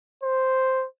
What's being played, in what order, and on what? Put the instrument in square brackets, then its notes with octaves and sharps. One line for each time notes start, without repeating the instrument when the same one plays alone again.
[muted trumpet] C5